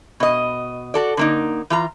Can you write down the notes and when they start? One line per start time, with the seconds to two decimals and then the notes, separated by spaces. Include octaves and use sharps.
0.20 B2 D#5
0.94 F#4 A4 D5
1.17 D3 A#3 D#4
1.70 E3 F4 A#5